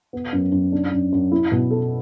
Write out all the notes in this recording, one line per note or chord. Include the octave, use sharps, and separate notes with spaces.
B3
F#2
F#2
D4
F#2
F#2
E4
B2
A4